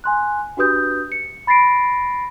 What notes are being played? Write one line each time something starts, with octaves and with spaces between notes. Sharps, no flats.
G#5 C6 F#6
D4 F#4 G4 B4 D#6 G6
C#7
B5 A6 A#6 C7 D7